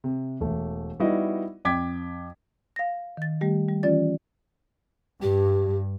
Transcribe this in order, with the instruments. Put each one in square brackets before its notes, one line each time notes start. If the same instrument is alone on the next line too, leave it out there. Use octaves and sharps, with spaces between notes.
[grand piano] C3
E1 A3
G3 B3 D#4 E4 F#4 D#5
F2 G5 D6 G#6 B6
[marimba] F5 A#6
D#3 A6
D#3 G3 A3 G4
G3
E3 C#4 F4 D5 A6
[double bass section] G2 [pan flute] G4